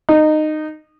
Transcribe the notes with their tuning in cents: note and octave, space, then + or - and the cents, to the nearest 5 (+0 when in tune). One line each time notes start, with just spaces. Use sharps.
D#4 -20